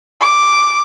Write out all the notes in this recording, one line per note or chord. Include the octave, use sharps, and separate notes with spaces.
D6